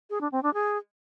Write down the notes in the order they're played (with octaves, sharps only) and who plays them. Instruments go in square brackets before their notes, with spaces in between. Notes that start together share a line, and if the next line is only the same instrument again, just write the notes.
[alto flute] G#4
D4
C4
D4
G#4